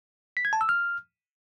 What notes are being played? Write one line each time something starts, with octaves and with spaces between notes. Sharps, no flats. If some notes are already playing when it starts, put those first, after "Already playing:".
B6
G#6
A5
E6
F6